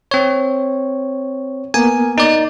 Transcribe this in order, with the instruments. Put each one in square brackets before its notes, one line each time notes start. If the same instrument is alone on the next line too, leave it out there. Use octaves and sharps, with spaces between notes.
[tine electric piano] C4 C#5
[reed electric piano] A#3 B3 A#4 [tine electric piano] G#5
[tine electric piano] D#4 D5